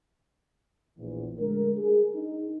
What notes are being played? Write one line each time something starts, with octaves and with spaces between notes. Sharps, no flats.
A#1 E2
D3 G#3 A3 D4 A#4
G#4
D4 D#4